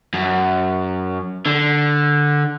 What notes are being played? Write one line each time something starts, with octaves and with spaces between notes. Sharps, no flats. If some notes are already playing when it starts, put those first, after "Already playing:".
F#2
D3